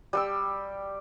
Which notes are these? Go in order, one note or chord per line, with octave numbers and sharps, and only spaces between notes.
G3 G5 E6